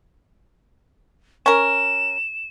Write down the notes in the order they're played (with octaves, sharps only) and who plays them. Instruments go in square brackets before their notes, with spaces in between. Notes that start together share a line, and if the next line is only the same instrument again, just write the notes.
[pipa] C#4 A#4 [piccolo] E7